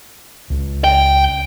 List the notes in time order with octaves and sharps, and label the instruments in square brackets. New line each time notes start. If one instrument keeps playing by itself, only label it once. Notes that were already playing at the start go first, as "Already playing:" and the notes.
[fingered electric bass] C#2
[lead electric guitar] G5